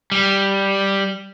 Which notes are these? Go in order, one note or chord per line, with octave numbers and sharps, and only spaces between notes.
G3